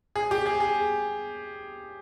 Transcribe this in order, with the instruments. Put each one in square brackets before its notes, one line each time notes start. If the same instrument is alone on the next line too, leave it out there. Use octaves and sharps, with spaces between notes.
[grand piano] G#4
G4
G#4
G#4